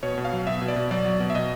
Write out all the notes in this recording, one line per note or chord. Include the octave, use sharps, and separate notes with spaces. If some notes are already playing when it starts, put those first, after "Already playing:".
B2 C#5
B2
F5
F#3
B2 E5
B2
D5
B2
F#3 D5
F#3
B2
E5
B2 D#5